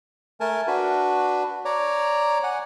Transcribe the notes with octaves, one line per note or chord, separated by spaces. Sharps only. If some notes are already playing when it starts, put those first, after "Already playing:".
A3 A#4 G#5 A5
D4 F#4 B4
C#5 D5 A#5
F#5 G#5